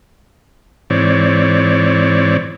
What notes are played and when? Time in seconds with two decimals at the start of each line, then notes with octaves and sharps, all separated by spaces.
0.90 G#2 E3 C4 C#5 D5